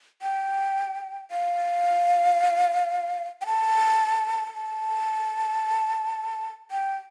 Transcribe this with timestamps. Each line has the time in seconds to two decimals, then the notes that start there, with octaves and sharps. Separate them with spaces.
0.22 G5
1.31 F5
3.41 G5
3.46 A5
4.55 A5
6.71 G5